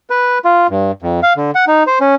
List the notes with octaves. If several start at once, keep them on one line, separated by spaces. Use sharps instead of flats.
B4
F4
G2
F2
F5
D3
F#5
D#4
C5
C#4